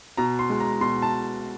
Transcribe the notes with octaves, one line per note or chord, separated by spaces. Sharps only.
B2 A#5
C6
G#3
A#5
B2 C6
A5